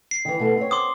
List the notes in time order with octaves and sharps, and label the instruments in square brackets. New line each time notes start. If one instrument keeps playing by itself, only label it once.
[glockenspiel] C7
[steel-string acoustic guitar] D#3 E3
B2 A3
C4 C#5
[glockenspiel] C6 D6 D#6